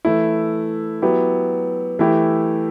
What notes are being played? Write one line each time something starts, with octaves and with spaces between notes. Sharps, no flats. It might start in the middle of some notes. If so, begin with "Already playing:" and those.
E3 A3 E4
F#3 B3 E4 G4
E3 A3 E4 G4